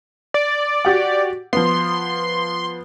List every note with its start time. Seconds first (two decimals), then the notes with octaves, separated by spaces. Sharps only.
0.34 D5
0.85 F#4 G4 F#5
1.53 F3 B3 C6